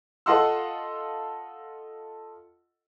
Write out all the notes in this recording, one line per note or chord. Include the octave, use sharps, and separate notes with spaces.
F4 A4 D#5 F#5 C6 E6